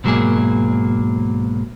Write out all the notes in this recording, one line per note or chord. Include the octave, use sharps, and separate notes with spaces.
G#2 B2 F#3 G#3 A#3 G#4